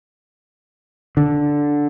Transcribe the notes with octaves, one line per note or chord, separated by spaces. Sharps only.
D3